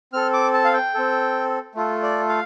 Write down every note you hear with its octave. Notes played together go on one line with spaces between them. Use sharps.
C4 A4 F6
D6
A5
F5
G5
C4 A4
A3 F4 A4
D5
F5